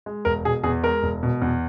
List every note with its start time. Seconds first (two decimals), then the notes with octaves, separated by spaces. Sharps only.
0.06 G#3
0.25 E1 A#4
0.45 B2 G#4
0.64 E2 G#4
0.83 G#3 A#4
1.03 E1
1.23 B2
1.42 E2